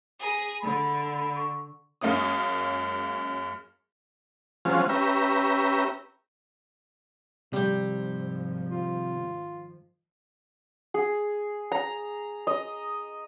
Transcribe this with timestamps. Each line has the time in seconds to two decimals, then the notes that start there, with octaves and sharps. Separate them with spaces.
0.20 G#4 A#5
0.62 D3 B5
1.37 C#6
2.01 F#2 G#3 A#3 C#4 D#6
4.65 F3 F#3 G#3 C4 C#4 F4
4.89 C#4 G4 B4 E5 A#5
7.53 G#2 C3 D#3 F3 G3 G4
8.71 F4
10.94 G#4
11.72 A#5
12.47 D#5